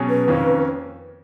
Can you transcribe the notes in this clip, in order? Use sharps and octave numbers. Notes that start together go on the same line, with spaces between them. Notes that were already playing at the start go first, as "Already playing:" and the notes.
Already playing: B2 F#3 C#4 G#4
B4
F2 D#3 A#3 C#4